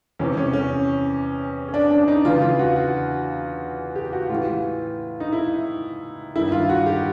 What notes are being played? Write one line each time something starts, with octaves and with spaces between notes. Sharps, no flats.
E2 C3 E3 C#4
C#4
C#4
C#4
D4
D4
D#4
E2 C#3 E3 F4
F4
F#4
F#4
G4
F#4
A2 E3 F4
D#4
E4
G2 D#3 E4
F4
F#4
G4